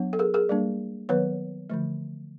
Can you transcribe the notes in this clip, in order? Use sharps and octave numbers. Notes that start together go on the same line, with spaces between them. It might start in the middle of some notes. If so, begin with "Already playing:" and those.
Already playing: F#3 B3 D4
A4
G#4 A#4
G#4 A#4
G3 A#3 D4
D#3 F#3 B3 B4 C#5
D3 F3 A3